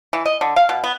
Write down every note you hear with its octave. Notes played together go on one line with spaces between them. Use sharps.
E3
D#5
D3
F5
B2
B3